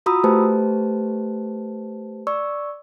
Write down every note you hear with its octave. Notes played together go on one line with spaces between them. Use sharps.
F4 F#4 A#5 B5 D#6 E6
A3 G4 B4 C5 A5
D5 C#6 E6